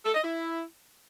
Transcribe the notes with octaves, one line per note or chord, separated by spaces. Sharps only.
A4
D#5
E4